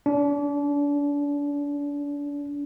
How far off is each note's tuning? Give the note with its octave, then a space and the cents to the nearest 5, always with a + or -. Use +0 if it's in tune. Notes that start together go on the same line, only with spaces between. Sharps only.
D4 -35